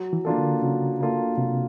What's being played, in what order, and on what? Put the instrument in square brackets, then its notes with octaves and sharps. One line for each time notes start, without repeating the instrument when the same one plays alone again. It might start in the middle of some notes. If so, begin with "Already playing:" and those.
Already playing: [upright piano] F#3
[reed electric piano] E3
[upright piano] A#3 D4 F4 A4
[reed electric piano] D3
[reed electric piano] C#3 [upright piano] F#3
[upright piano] A#3 D4 F4 A4
[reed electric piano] C3 [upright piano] F#3